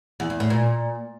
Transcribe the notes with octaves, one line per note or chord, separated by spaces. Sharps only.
E2
E2
A2
A#2